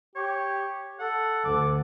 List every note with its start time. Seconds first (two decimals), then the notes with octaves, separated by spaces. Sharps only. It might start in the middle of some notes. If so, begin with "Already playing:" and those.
0.16 G4 C#5
0.99 A4 F#5
1.44 D2 D6